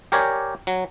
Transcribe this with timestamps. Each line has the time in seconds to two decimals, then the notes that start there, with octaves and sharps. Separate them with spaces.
0.12 G4 A#4 C#5 D5 G#5
0.67 F#3